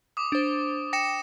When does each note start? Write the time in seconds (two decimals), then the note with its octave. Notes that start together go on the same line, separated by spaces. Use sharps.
0.17 D6 D#6
0.32 D4 C5
0.93 G5 A#6 C#7 E7